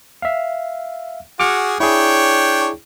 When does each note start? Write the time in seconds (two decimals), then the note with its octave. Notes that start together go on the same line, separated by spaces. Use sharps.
0.22 E5 F5
1.40 F#4 G#4 D6 F6 C#7
1.80 D4 E4 G#4 C#5 G5